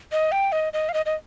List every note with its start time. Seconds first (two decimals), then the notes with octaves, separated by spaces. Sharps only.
0.12 D#5
0.32 G5
0.52 D#5
0.73 D#5
0.89 F5
0.94 D#5
1.06 D#5